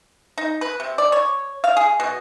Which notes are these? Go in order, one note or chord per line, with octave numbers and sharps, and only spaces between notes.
D#4
B4
C3
D5
C#5
F5
G#4
B2